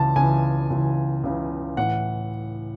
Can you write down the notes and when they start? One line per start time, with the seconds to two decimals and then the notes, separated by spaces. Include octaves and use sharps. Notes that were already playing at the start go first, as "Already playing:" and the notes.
Already playing: C#2 C#3 E3 A5
0.16 C#2 C#3 E3 G#5
0.70 C#2 C#3 E3
1.24 C#2 C#3 E3
1.77 A2 E3 F#5